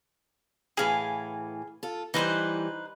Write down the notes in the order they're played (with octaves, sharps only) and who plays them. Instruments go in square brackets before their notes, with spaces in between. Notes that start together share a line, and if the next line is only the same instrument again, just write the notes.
[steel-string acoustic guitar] A2 E3 [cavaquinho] G#4 F5 B5
[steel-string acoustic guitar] F4 A4
[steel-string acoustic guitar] E3 G3 [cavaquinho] D#4 B4 C5